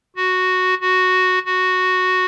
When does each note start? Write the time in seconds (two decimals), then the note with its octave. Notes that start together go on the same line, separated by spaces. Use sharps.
0.16 F#4
0.81 F#4
1.45 F#4